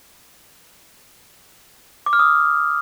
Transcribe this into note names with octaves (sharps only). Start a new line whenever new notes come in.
D6
F6
D#6